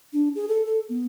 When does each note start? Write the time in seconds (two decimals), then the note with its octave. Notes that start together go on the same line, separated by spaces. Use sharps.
0.13 D4
0.35 G#4
0.48 A4
0.66 A4
0.89 B3